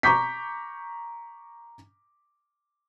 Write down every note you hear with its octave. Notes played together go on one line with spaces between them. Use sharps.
A#5 C#6 D6 G6 B6